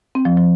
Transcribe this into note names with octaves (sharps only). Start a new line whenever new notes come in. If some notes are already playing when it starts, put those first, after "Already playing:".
C4
F3
F3